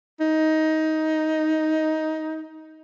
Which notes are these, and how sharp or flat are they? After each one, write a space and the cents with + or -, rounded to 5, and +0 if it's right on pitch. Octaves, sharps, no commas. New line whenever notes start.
D#4 +15